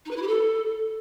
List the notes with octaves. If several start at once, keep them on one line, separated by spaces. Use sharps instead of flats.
D#4
B4
E4
G4
A4